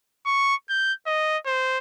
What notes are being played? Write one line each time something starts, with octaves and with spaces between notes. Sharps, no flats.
C#6
G6
D#5
C5